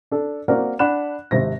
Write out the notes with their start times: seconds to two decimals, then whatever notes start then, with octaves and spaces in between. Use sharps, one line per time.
0.11 D4 A4
0.48 A#3 C4 F#4 A#4 D5 F#5
0.79 D4 F#5 B5 F#6 E7
1.31 G#1 C3 A#6